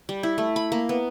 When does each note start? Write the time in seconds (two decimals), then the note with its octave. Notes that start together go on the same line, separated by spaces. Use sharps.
0.09 G3
0.23 E4
0.38 A3
0.56 B5
0.72 A#3
0.89 B3